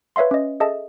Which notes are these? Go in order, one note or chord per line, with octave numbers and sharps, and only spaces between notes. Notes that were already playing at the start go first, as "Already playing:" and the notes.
B4 C#5 E5 F5 C6
C#4 D#5
G#4 A4 D#5 E5 A5